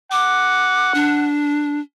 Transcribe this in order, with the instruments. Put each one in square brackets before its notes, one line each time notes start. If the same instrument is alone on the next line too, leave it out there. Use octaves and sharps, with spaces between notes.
[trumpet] F#5 [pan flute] D6
[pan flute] D4